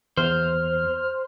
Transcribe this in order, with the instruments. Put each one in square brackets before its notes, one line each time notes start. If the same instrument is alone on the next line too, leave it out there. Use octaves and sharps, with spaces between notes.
[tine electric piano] E2 [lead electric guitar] C5 [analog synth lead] F6